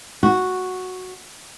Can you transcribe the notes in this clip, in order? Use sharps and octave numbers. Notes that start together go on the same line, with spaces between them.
F#4